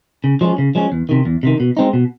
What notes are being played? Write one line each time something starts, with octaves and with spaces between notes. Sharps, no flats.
C#3
F3 G#3 C#4
C#3
F3 G#3 C#4
E2
C3 D#3
E2
C3 D#3
B2
G#3 C4 D#4
B2